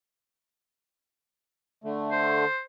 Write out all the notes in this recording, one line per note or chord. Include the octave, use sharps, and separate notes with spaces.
D3 A3
C5